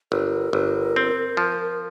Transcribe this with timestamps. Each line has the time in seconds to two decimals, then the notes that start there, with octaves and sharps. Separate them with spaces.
0.11 G1 A#4
0.53 G1
0.96 C4
1.37 F3